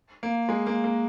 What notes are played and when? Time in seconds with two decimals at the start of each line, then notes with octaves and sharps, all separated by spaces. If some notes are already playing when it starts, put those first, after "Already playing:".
0.23 A#3
0.49 G#3
0.67 A#3
0.84 A#3